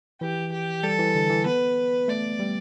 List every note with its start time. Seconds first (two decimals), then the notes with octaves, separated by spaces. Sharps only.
0.21 E3 G4
0.52 G4
0.83 G3 A4
0.99 E3
1.15 D3
1.30 E3
1.46 B3 B4
2.08 A3 D5
2.40 G3